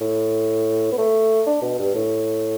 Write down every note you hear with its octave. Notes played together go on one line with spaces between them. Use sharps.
A2
B3
A3
D4
B2
G2
A2